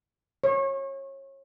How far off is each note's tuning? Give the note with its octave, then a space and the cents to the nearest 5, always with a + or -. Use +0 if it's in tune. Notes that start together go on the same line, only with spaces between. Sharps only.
C#5 -25